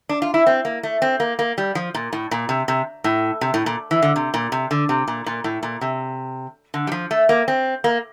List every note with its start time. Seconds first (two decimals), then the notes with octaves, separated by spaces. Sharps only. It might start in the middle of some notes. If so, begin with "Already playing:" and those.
0.09 D4
0.22 F4
0.34 E4
0.46 C4
0.65 A#3
0.83 A3
1.02 C4
1.20 A#3
1.39 A#3
1.58 G3
1.75 F3
1.94 A#2
2.13 A2
2.31 A#2
2.49 C3
2.68 C3
3.04 A2
3.41 C3
3.54 A2
3.66 A#2
3.91 E3
4.02 D3
4.16 C3
4.34 A#2
4.52 C3
4.71 D3
4.89 C3
5.08 A#2
5.26 A#2
5.44 A2
5.63 A#2
5.81 C3
6.74 D3
6.87 G3
6.92 F3
7.11 A3
7.29 A#3
7.48 C4
7.84 A#3